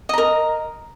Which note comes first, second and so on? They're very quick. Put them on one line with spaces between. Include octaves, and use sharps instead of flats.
D#5 A#5 A#4